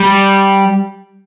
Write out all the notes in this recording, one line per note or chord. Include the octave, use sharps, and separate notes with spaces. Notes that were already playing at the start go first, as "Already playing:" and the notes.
Already playing: G3